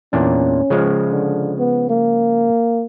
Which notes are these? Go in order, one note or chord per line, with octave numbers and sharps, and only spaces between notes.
E2 A#2 C#4 D4
C#3 F3 G#3
D3
B3
A#3